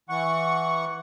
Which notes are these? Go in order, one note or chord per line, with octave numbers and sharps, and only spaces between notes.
E3 F#5 C#6